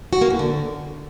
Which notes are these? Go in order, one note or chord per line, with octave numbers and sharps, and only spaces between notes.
F#4
A#3
E3
D3